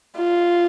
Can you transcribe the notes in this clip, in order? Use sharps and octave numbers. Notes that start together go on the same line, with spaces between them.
F4